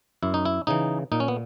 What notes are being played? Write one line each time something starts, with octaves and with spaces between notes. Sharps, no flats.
F#2 E4
D#4
E4
C#3 E3 D#4
A#2 D#4
C#4
B3